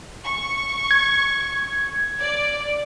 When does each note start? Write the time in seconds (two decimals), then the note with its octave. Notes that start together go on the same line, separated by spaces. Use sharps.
0.24 C#6
0.91 G#6
2.20 D5